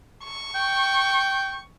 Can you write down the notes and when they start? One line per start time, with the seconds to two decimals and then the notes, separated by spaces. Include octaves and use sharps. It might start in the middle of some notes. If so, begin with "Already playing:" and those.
0.24 C#6
0.55 G5